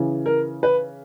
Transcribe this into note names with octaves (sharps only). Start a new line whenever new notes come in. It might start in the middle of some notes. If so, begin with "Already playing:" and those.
Already playing: C#3 E3
A#4
B4